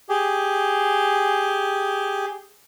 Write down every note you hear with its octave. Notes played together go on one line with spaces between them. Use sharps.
G4 G#4